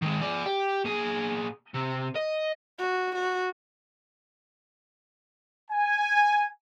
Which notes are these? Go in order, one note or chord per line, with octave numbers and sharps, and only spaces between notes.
D#3 G#3
G#4 D5
G4
A#2 G#4
C3
D#5
F#4
F#4
G#5